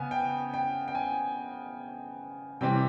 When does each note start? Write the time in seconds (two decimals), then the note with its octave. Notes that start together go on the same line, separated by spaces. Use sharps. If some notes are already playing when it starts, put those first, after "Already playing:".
Already playing: C#3 B3 G#5
0.11 G5
0.54 G5
0.88 G5
0.95 G#5
2.61 C3 E3 G3 C4 G5